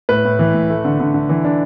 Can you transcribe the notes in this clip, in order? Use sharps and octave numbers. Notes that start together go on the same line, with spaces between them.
A2 B4
A2
E3
A2
A3
D3
D3
D3
E3
D4